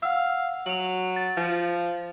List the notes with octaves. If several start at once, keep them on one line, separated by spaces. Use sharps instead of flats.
F5 F#5 E6
F#3 F7 F#7
A6
F3